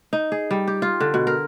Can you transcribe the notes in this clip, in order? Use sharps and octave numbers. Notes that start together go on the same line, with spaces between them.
D#4
G#4
G3
G4
F4
D3
B2
A#4